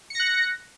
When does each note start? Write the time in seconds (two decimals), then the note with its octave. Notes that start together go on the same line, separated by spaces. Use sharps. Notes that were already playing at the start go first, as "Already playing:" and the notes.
0.10 C#7
0.15 A#6
0.20 F#6